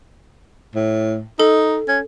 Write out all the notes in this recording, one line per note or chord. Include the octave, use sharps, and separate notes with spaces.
A2
D#4 A4
C#4